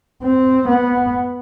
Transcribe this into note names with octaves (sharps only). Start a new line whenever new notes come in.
C4
B3